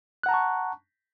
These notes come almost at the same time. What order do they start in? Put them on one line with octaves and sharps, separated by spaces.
F#6 F#5 A#5 A5 C#6